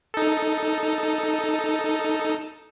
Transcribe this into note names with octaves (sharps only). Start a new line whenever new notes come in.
D#4 A4